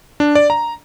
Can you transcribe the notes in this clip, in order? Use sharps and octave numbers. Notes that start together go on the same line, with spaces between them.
D4
D5
A#5